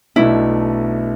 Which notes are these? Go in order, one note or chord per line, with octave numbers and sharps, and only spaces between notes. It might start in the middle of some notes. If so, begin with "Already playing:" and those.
B1 B2 A3 D4 E4